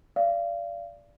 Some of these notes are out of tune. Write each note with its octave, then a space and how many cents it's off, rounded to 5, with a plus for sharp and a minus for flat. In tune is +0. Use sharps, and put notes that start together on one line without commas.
D5 -10 F5 -35